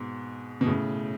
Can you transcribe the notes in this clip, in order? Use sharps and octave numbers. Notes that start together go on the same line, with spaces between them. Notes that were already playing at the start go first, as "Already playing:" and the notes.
Already playing: G#2 B2
B2
A2 C#3